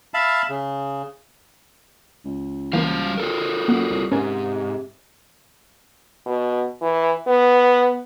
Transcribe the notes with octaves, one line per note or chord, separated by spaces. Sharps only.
E5 F5 A5 B5
C#3
C#2
E3 G3 A#3 C5 F5
F4 A4 A#4
F#2 A#3 F#5
C2
G#2 C3 C#4 A#4 G#5
B2
E3
B3